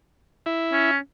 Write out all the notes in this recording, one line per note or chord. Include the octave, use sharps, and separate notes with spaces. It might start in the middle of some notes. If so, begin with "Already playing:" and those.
E4
C#4